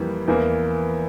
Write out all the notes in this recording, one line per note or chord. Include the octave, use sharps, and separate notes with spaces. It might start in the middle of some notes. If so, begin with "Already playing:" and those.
Already playing: F2 E3 G3 A#3
E2 E3 A#3